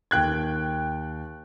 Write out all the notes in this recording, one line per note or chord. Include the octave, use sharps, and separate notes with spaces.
D#2 G5 F#6 G#6